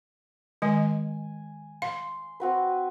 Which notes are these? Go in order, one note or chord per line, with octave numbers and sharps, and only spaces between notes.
D#3 G#3 D#5 G#5
F5 C6
C4 F#4 B4